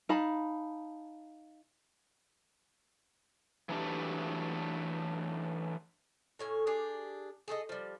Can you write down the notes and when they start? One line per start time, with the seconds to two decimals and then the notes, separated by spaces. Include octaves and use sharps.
0.09 D#4 F5 A5 B5
3.69 E3 F#3 A3 D4 G4
6.39 A2 C#4 G#5
6.67 D4 G4 G#4
7.48 G#4 A4 C5 D#5
7.69 F3 G3